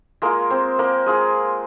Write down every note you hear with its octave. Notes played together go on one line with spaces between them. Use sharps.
G#3 A#3 F4 A#4
C4 C5
A#3 A#4
G#3 F4 G#4